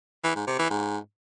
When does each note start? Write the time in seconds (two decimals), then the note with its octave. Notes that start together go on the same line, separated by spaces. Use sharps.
0.24 E3
0.36 G#2
0.47 C3
0.59 E3
0.71 G#2